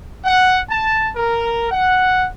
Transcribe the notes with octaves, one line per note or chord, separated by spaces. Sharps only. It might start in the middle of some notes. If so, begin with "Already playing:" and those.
F#5
A5
A#4
F#5